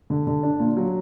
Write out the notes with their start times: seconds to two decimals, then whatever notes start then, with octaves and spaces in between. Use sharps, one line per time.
0.10 D3
0.27 D3
0.43 D4
0.60 A#2
0.77 F#3